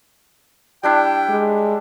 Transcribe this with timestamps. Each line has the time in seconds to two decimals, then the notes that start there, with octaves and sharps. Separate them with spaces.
0.83 G3 D4 E4 G5
1.29 G#3